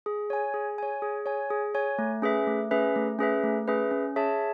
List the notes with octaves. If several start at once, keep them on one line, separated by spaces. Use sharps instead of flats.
G#4
C#5 G#5
G#4
C#5 G#5
G#4
C#5 G#5
G#4
C#5 G#5
A3
C#4 G#4 B4 E5
A3
C#4 G#4 B4 E5
A3
C#4 G#4 B4 E5
A3
C#4 G#4 B4 E5
C#4
G#4 C#5 E5 A5